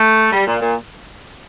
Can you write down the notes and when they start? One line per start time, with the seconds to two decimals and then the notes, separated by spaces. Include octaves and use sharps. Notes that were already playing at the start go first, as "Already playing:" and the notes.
Already playing: A3
0.32 G3
0.46 A#2
0.61 A#2